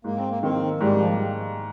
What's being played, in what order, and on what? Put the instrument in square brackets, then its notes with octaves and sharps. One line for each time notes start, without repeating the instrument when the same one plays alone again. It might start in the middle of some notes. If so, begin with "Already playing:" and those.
[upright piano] G#2 [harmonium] A#3
[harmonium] C4
A#3
[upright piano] D#3 A#3 [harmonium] C4
[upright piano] G#2 [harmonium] G3
[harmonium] F3